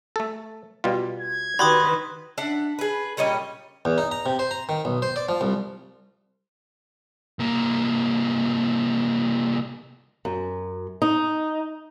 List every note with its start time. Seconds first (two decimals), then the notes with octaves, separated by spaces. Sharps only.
0.16 A3 A4
0.84 B2 G3 F4
1.18 G#6
1.59 D#3 F#4 G4 B4 D5 B5 C6 D#6
2.38 D4 E5 F#5
2.79 G#4 B4
3.17 A#2 G3 C#4 D#5
3.85 E2
3.98 D#4
4.12 A#5
4.26 C3
4.39 C5
4.51 A#5
4.69 D#3
4.85 B1
5.02 C5
5.16 D5
5.29 F3
5.41 C2
7.39 C2 A#3
10.25 F#2
11.02 D#4